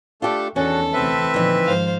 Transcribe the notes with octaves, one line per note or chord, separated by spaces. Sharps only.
A3 D4 F4 G4 A4
E2 D#3 C#4 D4 F#4 A4 A5
D2 C3 E3 C4 B4 E5
A#2 D3 E3 F3 D#4
G#2 D#3 F3 C5 F5